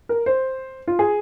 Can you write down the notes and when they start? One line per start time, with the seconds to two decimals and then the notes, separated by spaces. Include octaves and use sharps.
0.09 A#4
0.26 C5
0.88 F4
0.99 G#4